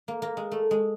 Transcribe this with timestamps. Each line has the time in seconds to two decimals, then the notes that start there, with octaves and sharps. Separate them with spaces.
0.08 A#3
0.22 A#3
0.37 G#3
0.51 A3
0.71 G#3